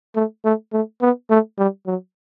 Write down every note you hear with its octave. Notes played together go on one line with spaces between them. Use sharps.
A3
A3
A3
B3
A3
G3
F#3